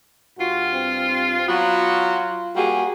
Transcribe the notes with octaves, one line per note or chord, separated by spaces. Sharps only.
G2 F4 F#4
C4
F#3 B3 F4 F#4
G3 A#3 F#4 G#4